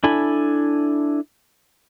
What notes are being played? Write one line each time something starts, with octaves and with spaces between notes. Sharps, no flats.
D4 E4 A4 G#5 B5